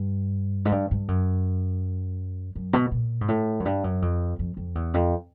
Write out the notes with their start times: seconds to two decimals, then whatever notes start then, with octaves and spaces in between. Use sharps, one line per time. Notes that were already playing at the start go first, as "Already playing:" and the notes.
Already playing: G2
0.65 G#2
0.72 G2
0.91 G2
1.08 F#2
2.55 F#2
2.73 B2
2.91 A#2
3.21 G#2
3.28 A2
3.60 F#2
3.65 G2
3.84 F#2
4.02 F2
4.39 F2
4.57 F2
4.75 E2
4.94 F2